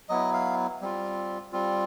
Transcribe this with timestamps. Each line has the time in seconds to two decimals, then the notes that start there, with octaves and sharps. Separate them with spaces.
0.09 F#3 B3 E4 D#5
0.34 F5
0.81 G3 C4 F4
1.52 G3 C4 F4